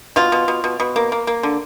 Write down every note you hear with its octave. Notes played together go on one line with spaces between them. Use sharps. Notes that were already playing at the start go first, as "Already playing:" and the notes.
B2 F4
B2
B2
B2
B2
A#3
A#3
A#3
D3